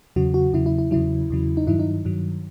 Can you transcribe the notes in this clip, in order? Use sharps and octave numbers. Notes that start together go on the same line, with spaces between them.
E2 C#3 F#3 F#4
F#4
E2 C#3 F#3 E4
E4
E4
E2 C#3 F#3 E4
E2 C#3 F#3
D#4
G2 D#3 F#3 E4
D#4
G2 D#3 F#3